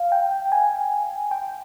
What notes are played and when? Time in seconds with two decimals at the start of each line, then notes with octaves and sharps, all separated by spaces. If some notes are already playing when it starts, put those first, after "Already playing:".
Already playing: F5
0.12 G5
0.52 G#5
1.31 G5